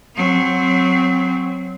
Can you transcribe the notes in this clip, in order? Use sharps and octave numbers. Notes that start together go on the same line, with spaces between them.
F#3 C4